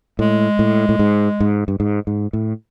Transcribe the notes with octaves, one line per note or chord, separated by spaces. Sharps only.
A2 G#3
A2
A2
G#2
G#2
G2
G#2
G#2
A2